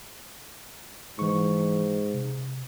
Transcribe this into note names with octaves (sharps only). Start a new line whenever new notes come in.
G#2 E3 C#6
C3